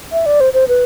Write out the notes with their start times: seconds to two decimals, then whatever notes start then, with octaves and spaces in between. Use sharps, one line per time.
0.12 E5
0.26 D5
0.40 C5
0.54 C5
0.68 B4